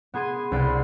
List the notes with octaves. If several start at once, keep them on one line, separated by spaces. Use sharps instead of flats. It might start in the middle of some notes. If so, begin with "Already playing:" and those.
B3 G#4 C6 G#6 D#7
C2 B4 D5 C6